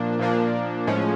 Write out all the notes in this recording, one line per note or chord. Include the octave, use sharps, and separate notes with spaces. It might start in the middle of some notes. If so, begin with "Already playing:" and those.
Already playing: A#2 F3 A#3 D4
A#2 F3 A#3 D4
A2 F3 G#3 C#4